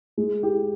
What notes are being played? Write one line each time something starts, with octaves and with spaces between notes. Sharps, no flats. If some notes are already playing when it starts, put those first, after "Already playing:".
G#3
G4